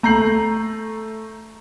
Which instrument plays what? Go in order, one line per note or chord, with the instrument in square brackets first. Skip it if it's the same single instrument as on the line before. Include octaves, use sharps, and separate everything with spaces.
[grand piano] A3 A#5 G6 C7 F#7